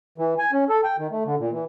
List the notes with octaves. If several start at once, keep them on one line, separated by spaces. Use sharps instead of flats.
E3
G#5
C#4
A4
G5
D#3
A3
D3
A#2
E3